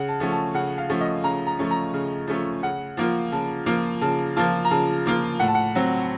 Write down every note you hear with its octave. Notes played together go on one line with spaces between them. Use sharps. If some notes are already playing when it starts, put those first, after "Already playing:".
Already playing: C#3 F#5
A5
F3 A3 C#4
A5
C#3 F#5
F5
F3 A3 C#4
D#5
C#3 A#5
A#5
F3 A3 C#4
A#5
C#3
F3 A3 C#4
C#3 F#5
F3 A#3 F4
C#3 A5
F3 A#3 F4
C#3 A5
F3 A#3 F4 A5
A#5
C#3 A5
F3 A#3 F4
A2 F#5
A5
F#5
F#3 C4